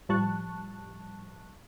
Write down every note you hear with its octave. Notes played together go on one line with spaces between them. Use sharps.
A2 F3 G3 A5 C#6 F#6